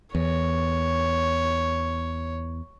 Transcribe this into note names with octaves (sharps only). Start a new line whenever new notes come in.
E2 C#5